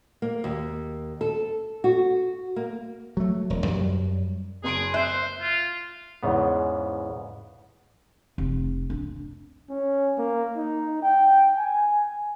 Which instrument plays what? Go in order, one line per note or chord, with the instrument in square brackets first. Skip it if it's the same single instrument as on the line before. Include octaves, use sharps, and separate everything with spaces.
[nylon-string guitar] A#3
D#2
A4
F#4
A#3
[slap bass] F#3 A3
E1
F#2 F#3 G3
[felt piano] F#1 C6 D7 [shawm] G#4
[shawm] C5 [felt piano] E5 F#6
[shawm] F4
[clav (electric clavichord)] E2 G#2 C#3 B3
[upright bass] F1
D4
[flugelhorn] C#4
A#3
D#4
G5
G#5